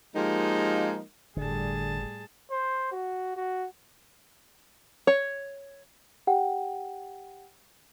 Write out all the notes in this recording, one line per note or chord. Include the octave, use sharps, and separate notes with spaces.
F3 G#3 A#3 D#4 G4 A#4
G1 A2 D3 G3 G#4 A5
C5
F#4
F#4
C#5
G4 F#5 G5